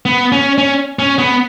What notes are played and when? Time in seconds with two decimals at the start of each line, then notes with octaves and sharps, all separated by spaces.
0.06 B3
0.32 C#4
0.58 C#4
0.99 C#4
1.19 B3